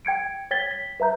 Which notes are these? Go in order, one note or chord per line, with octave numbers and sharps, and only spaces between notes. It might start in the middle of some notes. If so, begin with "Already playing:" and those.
G5 G#6 C#7 D7
C#5 G5 G#6 A6 B6 G7
B6
B4 E5 A#5 G6